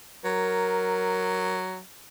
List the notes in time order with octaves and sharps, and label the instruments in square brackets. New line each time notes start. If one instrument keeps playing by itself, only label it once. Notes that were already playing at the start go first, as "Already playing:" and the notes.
[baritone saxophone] F#3 [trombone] A#4